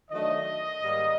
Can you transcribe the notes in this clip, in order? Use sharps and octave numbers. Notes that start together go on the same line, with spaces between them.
D#3 F#3 A3 D4 D#5
G#2 D#3 G3 A#3